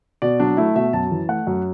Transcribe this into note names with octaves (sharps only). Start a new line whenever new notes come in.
B2 D5
F#3 D4
A3 E4
B2 E5
F#2 A5
E3
A3 F#5
F#2